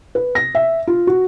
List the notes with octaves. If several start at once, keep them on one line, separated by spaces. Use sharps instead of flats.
B4
A#6
E5
F4
F#4